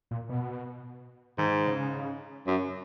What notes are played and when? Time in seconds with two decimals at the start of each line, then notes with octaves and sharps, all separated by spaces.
0.11 A#2
0.29 B2
1.38 G#2 D#3
1.66 C#3
2.47 F#2